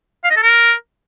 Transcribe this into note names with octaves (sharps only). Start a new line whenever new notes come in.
F5
D#5
A4
A#4